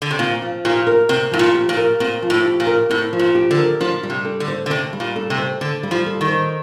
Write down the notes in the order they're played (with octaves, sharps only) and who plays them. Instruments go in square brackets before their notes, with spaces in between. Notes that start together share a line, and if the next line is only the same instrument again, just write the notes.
[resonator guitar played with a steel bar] D3
C3
[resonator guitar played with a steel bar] A#2 [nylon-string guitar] C4
[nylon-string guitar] F3
[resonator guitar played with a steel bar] A#2 [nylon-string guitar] G4
[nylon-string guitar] A#4
[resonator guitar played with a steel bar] C3 [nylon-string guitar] C4
[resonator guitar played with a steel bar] A2 [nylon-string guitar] F3
[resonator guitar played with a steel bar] A#2
[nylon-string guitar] G4
[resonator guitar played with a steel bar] A#2
[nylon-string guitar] A#4
[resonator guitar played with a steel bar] A#2 [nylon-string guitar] C4
[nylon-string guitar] F3
[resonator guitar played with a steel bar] A2
[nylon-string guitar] G4
[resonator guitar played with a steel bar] A#2
[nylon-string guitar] A#4
[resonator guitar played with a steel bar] A2 [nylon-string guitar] C4
[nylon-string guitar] F3
[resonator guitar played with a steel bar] A#2
[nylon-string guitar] G4
[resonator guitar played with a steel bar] D3
[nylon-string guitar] A#4
[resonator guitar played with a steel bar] F3 [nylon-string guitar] D4
[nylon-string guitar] G3
[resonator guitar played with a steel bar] C3
[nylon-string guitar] A4
[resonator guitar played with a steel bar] D3
[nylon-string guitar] C5
[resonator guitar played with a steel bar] D3
[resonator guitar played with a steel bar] C3 [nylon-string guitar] D4
[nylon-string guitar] G3
[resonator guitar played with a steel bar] A#2
[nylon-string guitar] A4
[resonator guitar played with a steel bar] C3
[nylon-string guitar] C5
[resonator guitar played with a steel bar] D3 [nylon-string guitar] D4
[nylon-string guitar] G3
[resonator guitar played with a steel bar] F3
[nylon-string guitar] A4
[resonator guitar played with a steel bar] D#3
[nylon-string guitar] C5